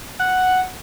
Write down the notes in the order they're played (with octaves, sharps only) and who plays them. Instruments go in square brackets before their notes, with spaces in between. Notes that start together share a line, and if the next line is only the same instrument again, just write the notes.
[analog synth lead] F#5